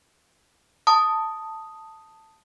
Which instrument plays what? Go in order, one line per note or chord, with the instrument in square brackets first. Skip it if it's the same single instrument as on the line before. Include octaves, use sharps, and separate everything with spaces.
[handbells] A5 D#6